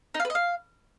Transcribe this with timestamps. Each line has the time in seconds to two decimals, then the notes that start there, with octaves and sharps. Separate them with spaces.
0.14 D#4
0.20 F5
0.25 B4
0.30 D#5
0.35 F5